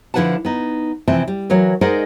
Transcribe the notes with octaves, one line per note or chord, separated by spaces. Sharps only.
D3 F3 E4 B4 F#5 A5
B3 D#4
C3 E3 F3 C4 A5
G3
E3 F#3 A#4 C#5
G#3 D#4 A#4 C5 D5 F#5